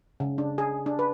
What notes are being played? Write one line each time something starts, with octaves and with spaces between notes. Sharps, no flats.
C#3
D4
G#4
D4
B4